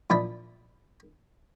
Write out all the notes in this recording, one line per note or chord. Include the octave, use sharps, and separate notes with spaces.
A#2 F3 D4 E4 D#5 B5